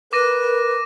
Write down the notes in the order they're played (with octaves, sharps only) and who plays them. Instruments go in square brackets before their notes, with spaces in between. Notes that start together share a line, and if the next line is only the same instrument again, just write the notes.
[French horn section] A#4 [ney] B4 [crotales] D6 A#6 D#7